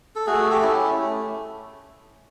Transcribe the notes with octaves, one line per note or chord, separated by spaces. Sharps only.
A4
A3 F#4 G#4
G4 A4
C#4 E4
A3